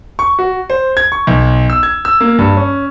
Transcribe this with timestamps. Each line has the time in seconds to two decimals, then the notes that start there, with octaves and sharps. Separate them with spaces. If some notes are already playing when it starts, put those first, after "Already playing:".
0.19 C#6
0.39 F#4
0.70 C5
0.97 G#6
1.12 C#6
1.27 B1
1.70 E6
1.83 G#6
2.05 E6
2.21 A#3
2.39 G2
2.57 C#4